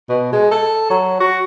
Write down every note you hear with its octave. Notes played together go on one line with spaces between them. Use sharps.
B2
G#3
A4
F#3
F#4